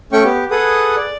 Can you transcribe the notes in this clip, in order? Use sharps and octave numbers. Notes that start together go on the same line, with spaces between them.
A3 C#4 G5 C#6
B3 G4
G#4 A4 B4 F#5 D#6
D5